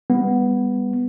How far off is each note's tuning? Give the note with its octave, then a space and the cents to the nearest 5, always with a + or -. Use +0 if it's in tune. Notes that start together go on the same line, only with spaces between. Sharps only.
G3 +30 B3 +0